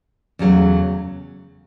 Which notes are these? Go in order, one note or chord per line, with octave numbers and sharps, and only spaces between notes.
E2 C#3 F#3 A3